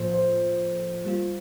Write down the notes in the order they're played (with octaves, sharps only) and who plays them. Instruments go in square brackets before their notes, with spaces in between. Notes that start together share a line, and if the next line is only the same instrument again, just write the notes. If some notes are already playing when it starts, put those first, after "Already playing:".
Already playing: [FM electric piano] A2 F3 A#3 F4 A4 [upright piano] C5
[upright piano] C5
[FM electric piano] G3 A#3 F4